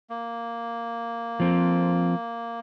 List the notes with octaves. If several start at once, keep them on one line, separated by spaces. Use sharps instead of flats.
A#3
F3 C4